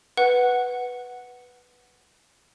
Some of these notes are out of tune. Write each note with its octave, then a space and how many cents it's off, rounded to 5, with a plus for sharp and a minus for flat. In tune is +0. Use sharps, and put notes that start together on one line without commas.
B4 +0 F#5 +0